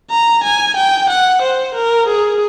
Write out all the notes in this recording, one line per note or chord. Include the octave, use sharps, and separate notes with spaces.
A#5
G#5
G5
F#5
C5
A#4
G#4